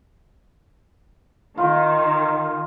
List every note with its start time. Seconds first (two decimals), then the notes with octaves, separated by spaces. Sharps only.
1.58 D#3 F4